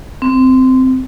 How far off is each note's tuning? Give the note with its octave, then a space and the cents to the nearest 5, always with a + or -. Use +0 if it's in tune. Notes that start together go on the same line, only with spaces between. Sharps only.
C4 -15